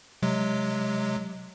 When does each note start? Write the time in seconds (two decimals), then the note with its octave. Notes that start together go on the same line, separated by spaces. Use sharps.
0.22 C3 F#3 G#3